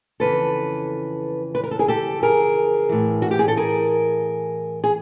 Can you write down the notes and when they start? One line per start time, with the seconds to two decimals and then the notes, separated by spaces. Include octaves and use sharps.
0.20 F2 C#3 E3 A4 B4
1.55 B4
1.64 A#4
1.71 A4
1.79 G#4 A#4
1.88 G4 A4
2.23 G#4 A#4
2.89 A2 E3
3.22 F#4
3.31 G4
3.39 G#4
3.48 A4
3.57 G#4 A#4
4.84 G#4